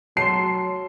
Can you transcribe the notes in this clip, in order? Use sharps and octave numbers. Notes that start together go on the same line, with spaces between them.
F#3 A5 C6 C7